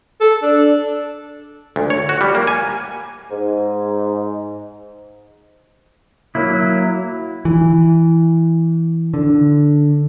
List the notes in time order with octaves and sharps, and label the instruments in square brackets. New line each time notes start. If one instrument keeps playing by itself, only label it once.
[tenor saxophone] A4
D4
[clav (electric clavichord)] D2
C#5
F#4
G3
A#3
G#5
[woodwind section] G#2
[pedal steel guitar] F#3 A#3 E4
[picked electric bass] E3
D3